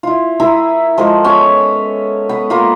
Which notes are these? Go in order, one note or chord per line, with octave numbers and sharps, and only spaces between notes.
E4 F4
E4 G#4 A#4
F3 G#3 A4 C#6
B3 C#4 C#5
B3
A#3 B3 F4